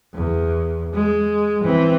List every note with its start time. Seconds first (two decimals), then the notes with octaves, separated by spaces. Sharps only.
0.14 E2
0.94 G#3
1.64 E3 C4